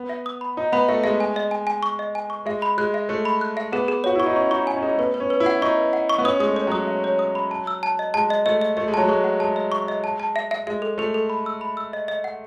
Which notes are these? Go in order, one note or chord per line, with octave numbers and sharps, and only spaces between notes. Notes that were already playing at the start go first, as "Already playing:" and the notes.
Already playing: B3
E5
D#6
B5
D#4 D#6
B3 B5
A3 E5
G#3 E5
G#5
D#5
G#5
G#5
C#6
D#5
G#5
C#6
G#3 E5
B5
G#3 F#6
E5
A3 F#6
B5
F#6
E5
B3 G#4
G#4
F#4 C#5
E4 C#6
D#4
C#4 C#6
D#4 C#6
D#4 G#5
C#4
D#4 G#4
A3
B3 B4
B4
C#4
B4
E4
F#5
D#4 C#6
B4
F#5
C#6
B3
C#4 D#6
G#3 D#6
A3
C#5
F#3 D#6
E5
C#5
D#6
B5
A5
E6
A5
D#5
G#3 A5
D#5
A3 D#5
D#5
A3 D#5
G#3
F#3 A5
G#3 C#6
F#5
G#3 A5
D#5
C#6
D#5
A5
A5
E5
E5
G#3 E5
A4
A3 A4
A4
B5
E6
B5
E6
D#5
D#5
F#5